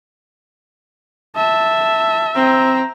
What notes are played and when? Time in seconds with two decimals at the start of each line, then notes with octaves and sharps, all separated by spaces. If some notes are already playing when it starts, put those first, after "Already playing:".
1.36 E5 A5
2.36 C4 C5 A#5